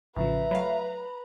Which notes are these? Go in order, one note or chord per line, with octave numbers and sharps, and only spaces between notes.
A1 A2 C#3 F3 B4 E5 A#5
F#3 A3 F5 B5